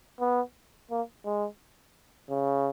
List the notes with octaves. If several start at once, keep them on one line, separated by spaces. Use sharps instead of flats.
B3
A#3
G#3
C#3